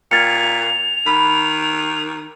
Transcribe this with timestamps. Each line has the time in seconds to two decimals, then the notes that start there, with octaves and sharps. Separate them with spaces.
0.11 A#2 G5 F6 G#6 A6 C#7 F7
1.06 D#3 B5